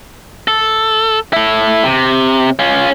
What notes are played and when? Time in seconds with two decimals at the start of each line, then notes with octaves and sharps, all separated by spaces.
0.48 A4
1.33 E4 A4
1.84 C3
2.59 C#4 F4